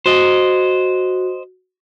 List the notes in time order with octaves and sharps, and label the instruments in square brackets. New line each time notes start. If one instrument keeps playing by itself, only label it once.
[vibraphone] F#4 [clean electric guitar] C5 D#5